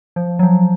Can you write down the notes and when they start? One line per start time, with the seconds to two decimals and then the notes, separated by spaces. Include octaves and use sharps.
0.16 F3
0.39 F#3
0.43 F3